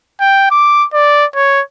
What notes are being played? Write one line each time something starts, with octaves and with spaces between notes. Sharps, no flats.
G5
D6
D5
C#5